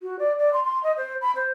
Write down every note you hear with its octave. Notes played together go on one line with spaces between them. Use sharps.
F#4
D5
D5
C6
C6
D#5
C5
B5
C5